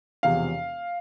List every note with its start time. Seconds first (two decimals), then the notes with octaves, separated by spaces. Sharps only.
0.23 E1 E2 C3 F3 F5